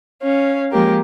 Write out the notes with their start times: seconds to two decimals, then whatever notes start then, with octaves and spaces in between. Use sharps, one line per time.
0.23 C#4 F5
0.72 F3 G#3 A#3 G4 A#4